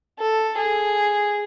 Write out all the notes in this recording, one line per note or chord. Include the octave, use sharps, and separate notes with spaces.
A4
G#4